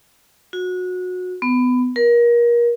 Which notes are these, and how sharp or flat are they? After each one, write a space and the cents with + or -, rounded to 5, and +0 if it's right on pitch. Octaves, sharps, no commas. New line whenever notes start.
F#4 -25
B3 +20
A#4 +30